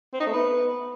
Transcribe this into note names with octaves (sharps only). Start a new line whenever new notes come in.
C4
D#4
A3
B3